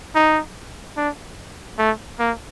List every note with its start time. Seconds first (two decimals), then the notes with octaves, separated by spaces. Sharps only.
0.15 D#4
0.97 D4
1.78 A3
2.19 A#3